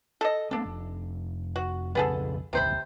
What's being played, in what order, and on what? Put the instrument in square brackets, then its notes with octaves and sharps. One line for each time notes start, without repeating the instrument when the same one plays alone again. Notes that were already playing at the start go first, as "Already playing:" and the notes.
[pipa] A4 D#5
[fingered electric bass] A3 B3 C4 [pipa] D4 A4
[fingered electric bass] F1
[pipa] F#4
[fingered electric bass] B1 F2 C#3 [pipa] B3 G#4 A4
[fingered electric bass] E1 A1 D2 [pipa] C3 C5 B5